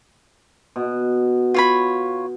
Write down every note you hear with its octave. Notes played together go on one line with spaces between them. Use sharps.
B2
F4 C#5 B5